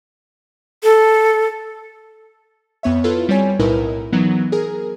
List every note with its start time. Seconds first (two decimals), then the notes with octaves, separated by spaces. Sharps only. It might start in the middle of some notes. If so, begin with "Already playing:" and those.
0.84 A4
2.83 F2 B3 C#5 E5
3.04 E4 F4 A4 B4
3.29 G3 C4 C#5 G#5
3.59 B1 A2 D#4 E4 A#4 B4
4.12 E3 F#3 B3 D#4
4.52 G#4 A#4